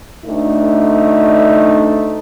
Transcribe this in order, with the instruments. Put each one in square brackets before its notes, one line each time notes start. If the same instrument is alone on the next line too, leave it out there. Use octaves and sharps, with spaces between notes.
[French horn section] D2 A3 D4 D#4